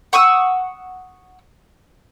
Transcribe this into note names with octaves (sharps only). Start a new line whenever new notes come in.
F#5 C#6 D#6 E6